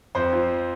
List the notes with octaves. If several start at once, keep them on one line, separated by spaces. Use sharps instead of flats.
F2 C5
F3